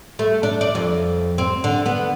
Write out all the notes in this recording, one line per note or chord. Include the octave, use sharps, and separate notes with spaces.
A3
D4
D5
F2
C4
D3
B3